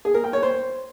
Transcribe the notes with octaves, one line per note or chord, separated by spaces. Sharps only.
G#4
A#4
G5
C#5
C5